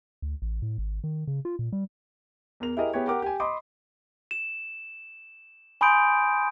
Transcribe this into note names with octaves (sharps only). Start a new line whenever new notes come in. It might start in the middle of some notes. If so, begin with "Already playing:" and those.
D2
A1
A2
G#1
D#3
C#3
F4
A#2
G3
E2 A#4 F7
E4 G4 G#4 A#4 D#5
B3 E4 G4 G#4 C#5
G4 A#4 F#5 D6
G4 G#5
D#5 B5 C6 D6 D#6
E7
G#5 B5 C6 D#6 G6 D7